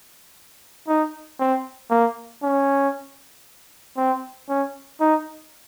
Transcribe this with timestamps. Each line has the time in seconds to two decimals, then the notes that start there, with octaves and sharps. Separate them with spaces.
0.88 D#4
1.39 C4
1.91 A#3
2.42 C#4
3.97 C4
4.49 C#4
5.00 D#4